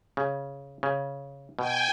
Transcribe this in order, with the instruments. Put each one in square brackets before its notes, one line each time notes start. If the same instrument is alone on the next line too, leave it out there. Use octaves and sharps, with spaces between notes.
[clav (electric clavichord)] C#3
C#3
[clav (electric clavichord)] B2 [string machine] G5 G#5